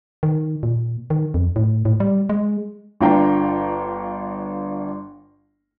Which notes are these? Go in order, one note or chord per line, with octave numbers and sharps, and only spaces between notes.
D#3
A#2
D#3
F2
A2
A2
G3
G#3
G1 D4 F4 G5 A#5